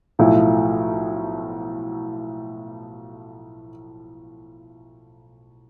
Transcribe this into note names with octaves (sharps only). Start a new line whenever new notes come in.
B1 A2 F3 A3 E4